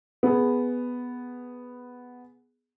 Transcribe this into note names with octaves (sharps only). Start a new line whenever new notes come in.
B3 G#4